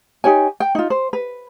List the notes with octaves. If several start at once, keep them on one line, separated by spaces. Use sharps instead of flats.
D#4 G4 C#5 G#5
G5
D#4 F4
C5
B4